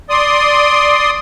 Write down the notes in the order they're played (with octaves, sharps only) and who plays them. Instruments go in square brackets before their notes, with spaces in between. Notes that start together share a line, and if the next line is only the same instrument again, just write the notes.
[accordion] D5 C6 D#6